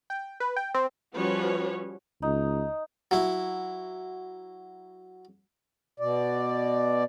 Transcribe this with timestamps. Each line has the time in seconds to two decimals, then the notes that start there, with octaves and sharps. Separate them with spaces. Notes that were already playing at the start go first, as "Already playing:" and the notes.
0.10 G5
0.40 B4
0.56 G5
0.74 C4
1.16 F3 G3 C#4 F#4 B4 C#5
2.22 C#2 D#4
3.11 F#3 E4
6.00 B2 D5